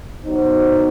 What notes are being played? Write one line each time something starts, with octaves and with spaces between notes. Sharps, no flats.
B2 F#3 B3 D#4 C5